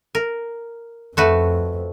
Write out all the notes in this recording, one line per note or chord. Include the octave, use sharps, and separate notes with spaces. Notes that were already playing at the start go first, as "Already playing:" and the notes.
A#4
F2 A3 F#4 B4